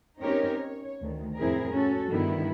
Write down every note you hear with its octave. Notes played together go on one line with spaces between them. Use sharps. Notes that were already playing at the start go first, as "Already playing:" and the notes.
C4 C#4 D#4 G4 A#4 C#5
C#5
D2 D#3
F2 A2 C4 E4 G#4 A#4
C#4 F#4 A4
G2 D3 D#3 G3 B3 E4